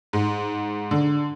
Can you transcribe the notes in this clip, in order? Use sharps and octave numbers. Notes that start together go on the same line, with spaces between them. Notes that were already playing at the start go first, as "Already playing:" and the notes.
G#2
D3